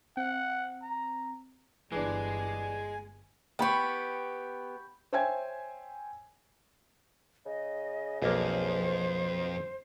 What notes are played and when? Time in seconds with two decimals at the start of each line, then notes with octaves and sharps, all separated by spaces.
0.17 C4 F#5
0.82 A#5
1.92 G1 E3 G#3 D4 G#5
3.59 B3 G4 G5 B5 C#6
5.13 C5 C#5 E5 G5 G#5 G#6
7.46 C#3 D#5
8.22 B1 F2 A#3 C5